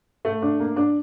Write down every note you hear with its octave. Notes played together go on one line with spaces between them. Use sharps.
A3
D4
A#3
D4